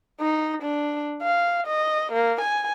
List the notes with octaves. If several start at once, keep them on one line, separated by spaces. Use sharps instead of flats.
D#4
D4
F5
D#5
A#3
G#5